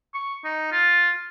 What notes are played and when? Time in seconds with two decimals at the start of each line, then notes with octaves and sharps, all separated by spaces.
0.14 C#6
0.44 D#4
0.72 F4